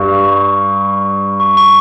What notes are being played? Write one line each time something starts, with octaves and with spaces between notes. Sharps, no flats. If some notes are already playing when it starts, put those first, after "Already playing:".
Already playing: G2 C#6
C#6
C#6